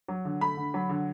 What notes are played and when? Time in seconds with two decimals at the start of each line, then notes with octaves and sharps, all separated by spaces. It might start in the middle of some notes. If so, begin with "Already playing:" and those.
0.08 F#3
0.25 D3
0.41 A3 B5
0.57 D3
0.74 F#3
0.89 D3